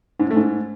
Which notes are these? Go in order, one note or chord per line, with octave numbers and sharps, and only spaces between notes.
G#2
A2
A3
G#2